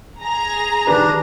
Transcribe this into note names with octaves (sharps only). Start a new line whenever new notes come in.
G#4 A#5
D#3 D4 G4 B4